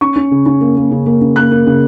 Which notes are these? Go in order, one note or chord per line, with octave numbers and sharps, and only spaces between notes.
C#4 C#6
C#4
C#3
C#4
A#3
A#3
C#3
A#3
C#3
A#3 F#6
A#3
C#3